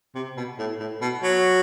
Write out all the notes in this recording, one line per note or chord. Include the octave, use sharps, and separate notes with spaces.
C3
B2
A2
A2
B2
F#3